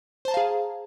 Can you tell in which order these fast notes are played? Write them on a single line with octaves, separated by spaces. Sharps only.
C5 A5 A#5 F5 G#4